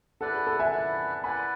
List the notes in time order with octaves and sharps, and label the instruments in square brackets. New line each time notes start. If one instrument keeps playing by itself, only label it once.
[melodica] E4 B4 D5 F#5 [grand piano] A4
[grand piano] G#4
A4
E5 G#5
[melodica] E4 B4 D5 F#5
[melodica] E4 B4 D5 F#5 [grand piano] G#5 B5